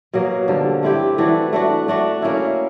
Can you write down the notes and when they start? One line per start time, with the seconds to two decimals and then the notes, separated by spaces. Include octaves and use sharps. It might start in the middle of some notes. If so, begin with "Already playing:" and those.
0.13 B2 F#3 A#3
0.48 G2 D3 F3
0.83 A3 C4 E4 G4
1.18 E3 A3 D4 F#4
1.53 A3 D4 F#4
1.88 A3 D4 F#4
2.22 A#3 C#4 E4